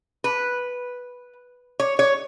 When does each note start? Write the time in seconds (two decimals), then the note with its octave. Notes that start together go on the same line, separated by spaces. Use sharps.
0.24 B4
1.80 C#5
1.99 C#5